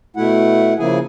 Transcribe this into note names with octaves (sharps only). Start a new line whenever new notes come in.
B2 A3 E4 F#5
C#3 F3 A#3 E4 G#4 G#5